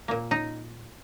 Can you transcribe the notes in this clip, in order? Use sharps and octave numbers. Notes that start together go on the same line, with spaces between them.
A#2 A#3
D#4